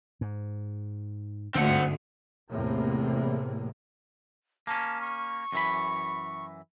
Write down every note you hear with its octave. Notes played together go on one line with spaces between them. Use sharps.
G#2
G1 D2 G#2 D3 C4 F#5
E2 A2 C3 A#3
A#3 C#4 A5
C#6
F#2 E3 B5